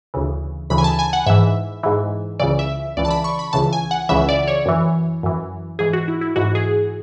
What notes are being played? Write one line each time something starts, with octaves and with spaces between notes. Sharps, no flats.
D2 C#3 E3
D2 C#3 E3 B5
G#5
A5
G#5
F#5
G#2 E3 E5
G#2 E3
C#2 C#3 E3 D5
E5
C#2 C#3 E3 D5
A5
B5
C#6
B5
C#2 C#3 E3 A5
G#5
F#5
C#2 C#3 E3 E5
D5
C#5
F#2 E3
F#2 E3
G#2 E3 G#4
F#4
E4
E4
G#2 E3 F#4
G#4